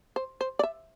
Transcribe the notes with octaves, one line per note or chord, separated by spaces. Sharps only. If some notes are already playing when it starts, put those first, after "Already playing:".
C5
C5
D5
E5